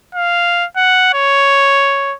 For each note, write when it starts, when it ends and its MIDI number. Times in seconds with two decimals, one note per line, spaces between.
0.15 0.66 77
0.77 1.11 78
1.14 2.15 73